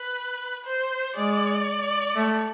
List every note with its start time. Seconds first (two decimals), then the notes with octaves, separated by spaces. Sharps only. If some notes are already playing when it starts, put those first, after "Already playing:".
Already playing: B4
0.66 C5
1.16 G#3 D5
2.16 A3